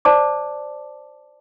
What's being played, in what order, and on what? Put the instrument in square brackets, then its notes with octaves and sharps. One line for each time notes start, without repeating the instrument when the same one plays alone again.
[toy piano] C5 D5 A5 D6